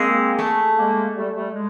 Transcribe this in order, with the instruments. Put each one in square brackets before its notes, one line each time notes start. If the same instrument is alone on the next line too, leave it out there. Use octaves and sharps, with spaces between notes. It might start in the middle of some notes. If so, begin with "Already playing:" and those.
Already playing: [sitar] G#3 [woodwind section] A#3 C4
[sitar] A3
[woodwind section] G#3 A#3
G3 A3
G3 A3
G#3